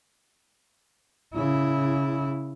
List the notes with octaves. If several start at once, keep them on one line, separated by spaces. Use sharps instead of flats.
C#3 E4